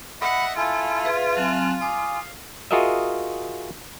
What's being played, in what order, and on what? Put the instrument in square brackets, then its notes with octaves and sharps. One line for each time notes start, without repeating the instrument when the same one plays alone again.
[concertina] D#5 E5 [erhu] F#5 [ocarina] B5
[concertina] E4 A4 [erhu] F4 [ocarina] G#5
[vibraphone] G#4 B4 C6 [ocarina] E5
[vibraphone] F#3 C4 G#5 [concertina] A5 F6 F#6
[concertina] F5 [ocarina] G#5 [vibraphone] D6 D#6
[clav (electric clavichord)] F4 F#4 G#4 A#4 D#5 E5